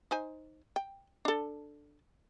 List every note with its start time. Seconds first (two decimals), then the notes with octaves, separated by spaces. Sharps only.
0.11 D#4 C5 G#5
0.76 G5
1.25 D4 A4